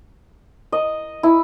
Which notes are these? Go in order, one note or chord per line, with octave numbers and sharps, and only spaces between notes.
D#5
E4